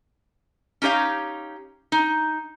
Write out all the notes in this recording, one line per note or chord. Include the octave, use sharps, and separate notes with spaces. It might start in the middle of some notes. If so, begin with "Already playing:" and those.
C#4 D#4 G4 C#5 F5
D#4